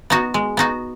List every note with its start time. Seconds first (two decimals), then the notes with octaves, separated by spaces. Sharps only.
0.10 B3 D#4 F#4
0.34 G#3
0.57 B3 D#4 F#4